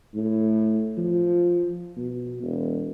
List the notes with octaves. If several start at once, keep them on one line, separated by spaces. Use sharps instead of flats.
A2
F3
B2
E1